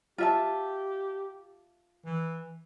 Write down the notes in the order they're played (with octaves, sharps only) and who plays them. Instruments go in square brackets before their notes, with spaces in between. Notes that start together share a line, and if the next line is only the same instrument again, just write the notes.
[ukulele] F4 E5 A5 [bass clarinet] G4
[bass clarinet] E3